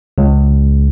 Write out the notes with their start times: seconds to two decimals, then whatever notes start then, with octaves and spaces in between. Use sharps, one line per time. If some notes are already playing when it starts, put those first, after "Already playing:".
0.18 C#2